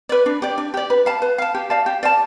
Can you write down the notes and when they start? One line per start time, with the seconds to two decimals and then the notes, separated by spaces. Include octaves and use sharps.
0.09 B4 D5
0.26 D4
0.42 G4 D5
0.58 D4
0.74 G4 D5
0.90 B4
1.06 F5 A5
1.22 B4
1.38 F5 A5
1.54 G4
1.70 D5 F5 A5
1.86 G4
2.03 D5 F5 A5